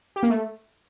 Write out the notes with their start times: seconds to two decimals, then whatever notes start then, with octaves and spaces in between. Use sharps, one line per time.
0.16 G4
0.23 A#3
0.30 A3